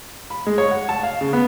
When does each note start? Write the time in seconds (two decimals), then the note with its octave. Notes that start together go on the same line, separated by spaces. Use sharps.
0.30 B5
0.46 G#3
0.58 C#5
0.71 F#5
0.89 A5
1.03 F5
1.21 C#3
1.33 B3